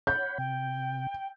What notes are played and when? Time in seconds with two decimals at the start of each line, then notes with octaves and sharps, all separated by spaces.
0.07 C#5 F#5 B5 G6
0.38 C3 G5